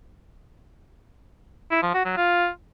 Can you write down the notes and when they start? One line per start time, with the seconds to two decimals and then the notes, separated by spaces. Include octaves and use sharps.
1.71 E4
1.83 F3
1.94 F#4
2.05 F#3
2.17 F4